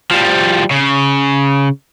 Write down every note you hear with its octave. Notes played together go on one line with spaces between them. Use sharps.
F3 G3
C#3